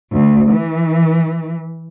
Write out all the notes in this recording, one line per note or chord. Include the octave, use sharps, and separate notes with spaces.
D2
E3